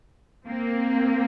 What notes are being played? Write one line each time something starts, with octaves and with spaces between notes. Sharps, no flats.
A#3 C4